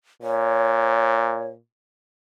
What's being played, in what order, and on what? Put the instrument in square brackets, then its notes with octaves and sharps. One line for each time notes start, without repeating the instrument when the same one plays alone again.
[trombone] A#2 [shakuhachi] C#5